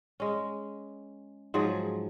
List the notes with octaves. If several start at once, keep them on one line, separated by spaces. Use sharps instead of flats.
G#3 C#4
G#2 F3 F#3 G#4